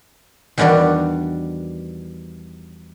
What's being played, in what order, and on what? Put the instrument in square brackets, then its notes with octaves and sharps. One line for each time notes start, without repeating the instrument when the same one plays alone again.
[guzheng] E2 D#3 G3 D4 F#4 D5